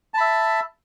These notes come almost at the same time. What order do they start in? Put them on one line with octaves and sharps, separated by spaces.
A5 B5 E5